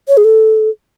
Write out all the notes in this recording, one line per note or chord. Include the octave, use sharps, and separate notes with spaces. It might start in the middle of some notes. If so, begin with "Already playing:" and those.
C#5
G#4
A4